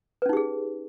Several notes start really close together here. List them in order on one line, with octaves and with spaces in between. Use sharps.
B4 C#4 D#4 G4 G#4